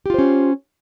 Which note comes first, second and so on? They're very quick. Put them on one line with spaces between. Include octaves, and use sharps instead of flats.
G4 F4 C5 C#4